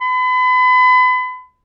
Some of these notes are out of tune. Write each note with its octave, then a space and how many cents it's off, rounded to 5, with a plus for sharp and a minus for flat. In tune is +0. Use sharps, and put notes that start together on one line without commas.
B5 +35